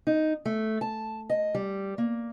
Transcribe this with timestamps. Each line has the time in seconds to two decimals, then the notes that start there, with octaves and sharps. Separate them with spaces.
0.07 D#4
0.46 A3
0.81 A5
1.29 D#5
1.55 G3
1.98 A#3